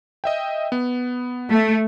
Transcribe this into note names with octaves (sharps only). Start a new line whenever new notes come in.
D#5 E5 G5
B3
A3